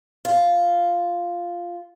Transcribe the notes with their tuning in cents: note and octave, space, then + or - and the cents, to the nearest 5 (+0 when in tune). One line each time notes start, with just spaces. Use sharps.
F4 +0